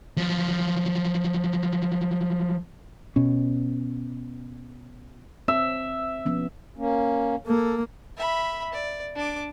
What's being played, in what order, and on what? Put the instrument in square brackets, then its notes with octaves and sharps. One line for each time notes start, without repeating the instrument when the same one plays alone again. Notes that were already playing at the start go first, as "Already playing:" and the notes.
[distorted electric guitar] F3 F#3
[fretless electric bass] B2 C#4
[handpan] C4 [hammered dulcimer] E5
[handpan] F3 B3 C#4
[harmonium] A#3 C#4
[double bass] A#3 [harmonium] A4
[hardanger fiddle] E5 B5
D5
D4 D6